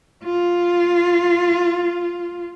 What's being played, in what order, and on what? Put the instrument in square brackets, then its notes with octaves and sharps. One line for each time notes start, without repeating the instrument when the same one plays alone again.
[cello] F4